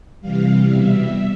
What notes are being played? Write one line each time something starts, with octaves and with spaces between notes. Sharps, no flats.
C3 E3 G3 F5
B2 G3 E5